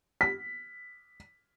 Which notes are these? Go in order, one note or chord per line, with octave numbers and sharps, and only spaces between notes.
B6